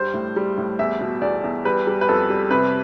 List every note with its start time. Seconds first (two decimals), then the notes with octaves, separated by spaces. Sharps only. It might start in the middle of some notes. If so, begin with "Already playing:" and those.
Already playing: G2 G3 C5
0.14 A2
0.36 G3
0.58 A2
0.79 E2 E5
1.01 B2
1.21 E2 D5
1.44 E2
1.65 G3 B4
1.87 G3
2.01 B4
2.09 F2 A4
2.30 G3
2.51 C3 B4